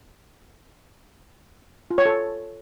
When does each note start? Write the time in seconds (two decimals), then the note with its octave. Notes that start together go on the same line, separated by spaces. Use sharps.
1.91 F4
1.98 C#5
2.05 A4